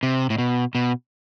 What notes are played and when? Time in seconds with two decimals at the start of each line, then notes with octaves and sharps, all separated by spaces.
0.03 C3
0.30 A2
0.38 B2
0.75 B2